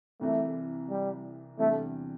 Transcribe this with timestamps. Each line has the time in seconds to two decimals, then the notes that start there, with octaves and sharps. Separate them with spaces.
0.21 C2 C3 E3 A3
0.90 G3
1.59 E2 C3 G3 A3 D4